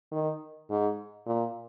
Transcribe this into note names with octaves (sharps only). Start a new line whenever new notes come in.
D#3
G#2
A#2